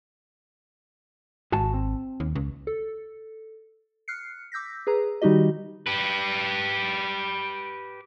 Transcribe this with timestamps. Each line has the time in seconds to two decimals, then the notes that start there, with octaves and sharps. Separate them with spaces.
1.52 G#1 F#4 G#5 A5
1.74 C4
2.20 D#2
2.35 C#2
2.67 A4
4.08 F6 F#6 C7 C#7
4.52 D6 E6 G6 A#6 B6
4.87 G#4 B4 A#5
5.22 D#3 G3 D#4 F#4 G4 D#5
5.87 G4 B4